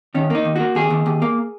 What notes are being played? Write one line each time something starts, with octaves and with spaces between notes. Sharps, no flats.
D#3 C#4
A#3 D#4
D#2
A#3 F#4
D#2 G#4
D#2
D#2
A#3